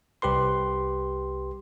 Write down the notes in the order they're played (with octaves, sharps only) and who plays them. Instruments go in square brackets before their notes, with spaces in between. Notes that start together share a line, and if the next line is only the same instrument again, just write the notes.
[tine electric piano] C2 G4 B4 C6